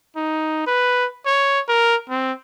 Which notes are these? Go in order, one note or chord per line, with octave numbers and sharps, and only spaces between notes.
D#4
B4
C#5
A#4
C4